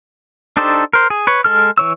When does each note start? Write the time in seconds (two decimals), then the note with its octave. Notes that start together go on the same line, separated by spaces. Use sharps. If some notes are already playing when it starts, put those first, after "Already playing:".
0.57 D4 D#4 G4 A4 C5
0.93 A#4 C5
1.10 G#4
1.27 B4 C#5
1.44 G#3 A4 F6
1.78 E3 C#5 E6